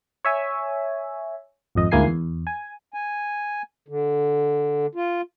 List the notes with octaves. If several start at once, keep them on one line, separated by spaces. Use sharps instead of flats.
C#5 E5 G#5
G#1 F2 D#5
D2 G#2 A#3 E4 G#5 C7
E2
G#5
G#5
D3
F4